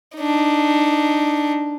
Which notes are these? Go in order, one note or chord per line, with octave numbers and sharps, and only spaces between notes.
D4 D#4